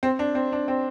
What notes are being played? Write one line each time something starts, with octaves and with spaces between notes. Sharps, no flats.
C4
D4
C4
D4
C4